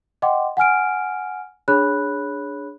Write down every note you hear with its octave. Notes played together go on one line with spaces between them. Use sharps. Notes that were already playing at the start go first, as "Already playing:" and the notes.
D#5 F#5 G5 C6 D6
F#5 G#5 F6 D7
D4 G#4 C#5 B5 F#6